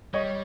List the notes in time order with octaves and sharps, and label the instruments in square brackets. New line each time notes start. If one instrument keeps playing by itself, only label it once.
[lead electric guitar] G3 [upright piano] C#5 D#5